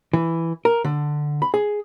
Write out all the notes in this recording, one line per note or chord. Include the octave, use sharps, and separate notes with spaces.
E3
A#4
D3
B5
G#4